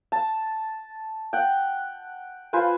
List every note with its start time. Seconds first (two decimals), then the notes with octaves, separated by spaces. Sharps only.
0.12 A5
1.33 F#5 G5
2.53 F4 B4 C5 G#5